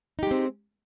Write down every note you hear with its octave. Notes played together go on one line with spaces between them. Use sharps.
G#3 C4 D#4 G4